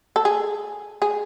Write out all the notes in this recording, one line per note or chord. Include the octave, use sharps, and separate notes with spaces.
A4
G#4
G#4